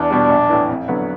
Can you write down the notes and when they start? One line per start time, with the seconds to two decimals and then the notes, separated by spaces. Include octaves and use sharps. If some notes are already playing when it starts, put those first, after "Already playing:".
Already playing: E2 D4
0.11 B2 G3
0.30 A#1
0.50 A2 E3
0.69 F2
0.88 D3 F#3 B3